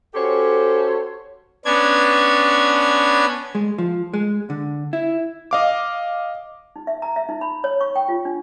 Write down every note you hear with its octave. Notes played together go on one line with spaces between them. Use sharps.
C#4 F#4 G4 A4 C5 C#5
B3 C#4 D4 G#6
G#3
F3
G#3
D3
E4
D#5 F5 D6
D#4
E5
A#5
E5
D#4
B5
C#5
C#6
G5
F4
D4